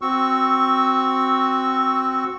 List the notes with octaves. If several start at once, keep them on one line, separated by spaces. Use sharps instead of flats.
C4 F#4 C#6 E6